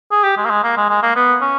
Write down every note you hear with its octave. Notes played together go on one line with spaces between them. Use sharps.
G#4
G4
G#3
A#3
G#3
A#3
G#3
G#3
A#3
B3
C#4